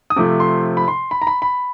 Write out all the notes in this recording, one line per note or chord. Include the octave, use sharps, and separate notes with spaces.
D#6
C3 F3 A3 D6
C6
B5
C6
B5
A#5
B5
B5